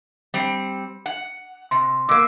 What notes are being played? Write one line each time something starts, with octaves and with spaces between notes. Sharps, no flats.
G3 C4
F#5
C3 C6
B2 A#3 D6 E6